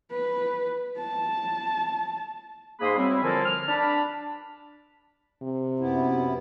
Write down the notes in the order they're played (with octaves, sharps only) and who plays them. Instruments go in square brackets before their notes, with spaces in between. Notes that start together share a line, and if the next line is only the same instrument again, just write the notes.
[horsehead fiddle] B4
A5
[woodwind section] G#2 A#3 G#4 B5 C6 D#6
F#3 G3 C4 E4
A#2 D3 F3 A#3 A4 G#5
F6
D4 A5 B5
[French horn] C3
[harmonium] F#2 B3 E4